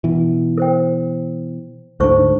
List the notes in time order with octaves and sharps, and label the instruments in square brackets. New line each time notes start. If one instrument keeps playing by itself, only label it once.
[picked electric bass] B2 E3
[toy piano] A#4 C5 G5
[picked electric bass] D2 G#2 D3 [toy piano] D#4 C5 C#6